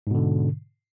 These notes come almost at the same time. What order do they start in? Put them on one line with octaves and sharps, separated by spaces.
G#2 B2 D3